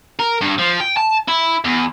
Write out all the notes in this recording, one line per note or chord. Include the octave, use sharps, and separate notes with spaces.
A#4
G2
F3
G5
A5
E4
E2